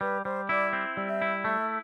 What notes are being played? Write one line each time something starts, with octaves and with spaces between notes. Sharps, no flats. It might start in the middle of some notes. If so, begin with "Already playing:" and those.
G3 B4
G3 C5
E4 D5
C4
G3
E5
E4
A3 E5